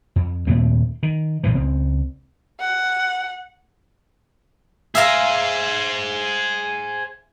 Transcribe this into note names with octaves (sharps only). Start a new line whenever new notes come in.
F2
D#2 A#2 A3 C4
D#3
A#1 A2 E3 F3
C#2 C4
F#5
G#4 C5 E5 F5 A#5